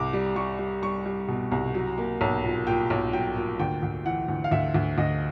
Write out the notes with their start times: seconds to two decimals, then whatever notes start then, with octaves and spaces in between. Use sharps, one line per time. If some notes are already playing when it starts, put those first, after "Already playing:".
Already playing: C2 D6
0.13 G3
0.36 G3 C#6
0.59 G3
0.82 G3 C#6
1.06 G3
1.28 B2
1.52 C2
1.74 F#3
1.98 A#3
2.21 B1
2.44 A#2
2.67 A#2 G5
2.90 B1
3.13 F#3 G5
3.36 A#2
3.59 D2 G5
3.83 D2
4.06 E3 F#5
4.28 D2
4.44 F5
4.51 D2 E5
4.74 D2
4.98 D2 D#5